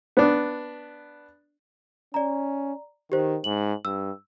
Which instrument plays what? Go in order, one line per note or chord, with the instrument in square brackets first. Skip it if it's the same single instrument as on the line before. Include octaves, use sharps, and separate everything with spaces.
[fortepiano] B3 D4
[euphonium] C#4 [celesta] D5 A#5
[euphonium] D#3 [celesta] G4 C5
[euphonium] G#2 [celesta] F#7
[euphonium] G2 [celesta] E6